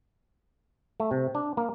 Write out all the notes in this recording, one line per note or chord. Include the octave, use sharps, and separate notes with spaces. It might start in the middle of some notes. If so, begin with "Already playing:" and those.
A3
C3
D4
A#3